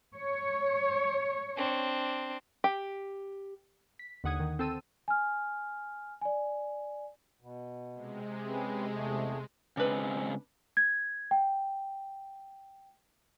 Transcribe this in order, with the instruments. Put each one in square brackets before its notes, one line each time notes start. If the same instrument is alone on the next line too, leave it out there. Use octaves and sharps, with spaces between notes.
[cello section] C#5
[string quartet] C4 D4
[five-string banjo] G4
[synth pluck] B6
D#2 D3 F#5 D#6 G#6
D#3
C4 A4 A5 E6 D#7
[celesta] G#5 F6
D5 G#5
[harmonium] B2
[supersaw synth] C3 G#3
[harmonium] C4 C#4 B4
E2 A3 G#4
[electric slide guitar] C#3 G#3 C4 [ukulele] D4 B4
[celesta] G#6
G5